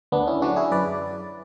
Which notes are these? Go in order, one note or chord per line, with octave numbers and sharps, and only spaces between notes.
D2 B3 D4
C#4 E4
D3 F#3 D4 F#4
E4 G#4
F#2 B4 D5